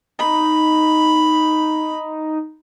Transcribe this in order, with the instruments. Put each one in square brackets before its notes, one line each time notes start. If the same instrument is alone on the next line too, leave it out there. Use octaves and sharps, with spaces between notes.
[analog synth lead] D#4 [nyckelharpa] B5